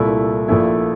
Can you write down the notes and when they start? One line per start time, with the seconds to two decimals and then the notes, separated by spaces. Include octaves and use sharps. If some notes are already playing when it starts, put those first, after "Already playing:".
Already playing: C2 A#2 A3 E4
0.48 A#1 A#2 A3 E4